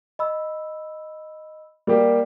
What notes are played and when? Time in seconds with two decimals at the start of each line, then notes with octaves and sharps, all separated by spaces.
0.19 D#5 B5 E6
1.87 G3 A#3 G4